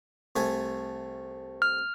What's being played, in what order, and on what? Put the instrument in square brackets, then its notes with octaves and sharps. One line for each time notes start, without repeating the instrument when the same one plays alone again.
[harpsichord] C2 A3 G#5
[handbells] F6